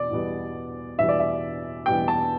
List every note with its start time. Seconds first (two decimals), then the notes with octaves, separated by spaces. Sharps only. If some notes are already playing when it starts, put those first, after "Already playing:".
Already playing: E2 B2 D5
0.10 E2 B2 G3 B3
0.98 E2 B2 G3 B3 E5
1.09 D5
1.20 E5
1.86 E2 B2 G3 B3 G5
2.08 A5